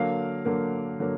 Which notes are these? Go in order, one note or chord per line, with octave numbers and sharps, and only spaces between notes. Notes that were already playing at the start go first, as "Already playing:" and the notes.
Already playing: D3 F#3 A#3 F5
D3 F#3 A#3
D3 F#3 A#3